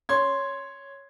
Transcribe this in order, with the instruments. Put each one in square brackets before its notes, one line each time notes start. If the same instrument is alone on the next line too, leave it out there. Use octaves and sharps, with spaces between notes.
[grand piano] C#5 C6 G#6